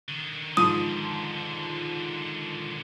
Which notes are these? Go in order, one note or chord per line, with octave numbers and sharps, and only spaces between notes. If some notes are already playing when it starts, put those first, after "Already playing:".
D3 D#3
G#2 F3 D#6 D#7